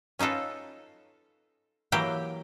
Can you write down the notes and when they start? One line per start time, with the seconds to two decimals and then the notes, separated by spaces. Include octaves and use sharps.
0.19 C#4 D#4 F4 A4 B4
1.92 E3 F#3 A#3 G4 A#4 G5